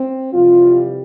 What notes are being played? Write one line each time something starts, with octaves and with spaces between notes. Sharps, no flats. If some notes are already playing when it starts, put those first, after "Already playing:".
Already playing: C4
F2 C3 E3 G3 F4